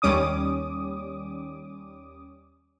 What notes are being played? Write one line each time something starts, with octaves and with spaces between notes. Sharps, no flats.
D#2 G3 C#4 D6 D#6